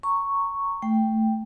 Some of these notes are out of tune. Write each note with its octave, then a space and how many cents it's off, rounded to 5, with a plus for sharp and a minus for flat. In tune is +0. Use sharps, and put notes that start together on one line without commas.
A#5 -20 C#6 +0
A3 +0 G5 +0